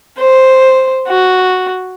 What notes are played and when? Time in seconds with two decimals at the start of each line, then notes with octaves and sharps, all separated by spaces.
0.19 C5
1.09 F#4